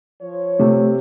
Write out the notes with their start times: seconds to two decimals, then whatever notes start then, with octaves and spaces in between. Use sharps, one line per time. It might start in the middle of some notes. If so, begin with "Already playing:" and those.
0.22 F3 C#5
0.59 C3 A3